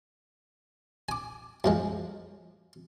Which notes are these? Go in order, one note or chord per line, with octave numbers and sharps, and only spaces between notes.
G#5 D6
F#2 F3 G#3